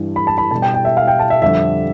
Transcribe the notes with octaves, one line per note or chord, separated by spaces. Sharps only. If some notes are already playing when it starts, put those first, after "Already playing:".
Already playing: G2 E3 G3
B5
A5
B5
B2 G3 A5
G5
G5
E5
F5
G5
A5
E5
F2 D3 G3 E5